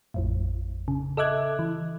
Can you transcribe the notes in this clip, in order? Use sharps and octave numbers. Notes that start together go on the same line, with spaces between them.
A1 F2 A2
C#3
A4 D#5 E5 D6 F#6 G#6
E3